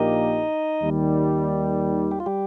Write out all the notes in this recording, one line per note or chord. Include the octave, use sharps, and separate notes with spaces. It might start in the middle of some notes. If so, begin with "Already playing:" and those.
Already playing: A#1 A#2 A#3 D#4 G4 D#5
D#2 D#3 G3
G4
F4
G3 G4